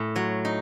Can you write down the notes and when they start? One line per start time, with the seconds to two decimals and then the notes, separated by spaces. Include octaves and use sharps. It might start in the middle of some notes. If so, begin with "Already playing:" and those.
Already playing: A2
0.16 F#3
0.45 D#4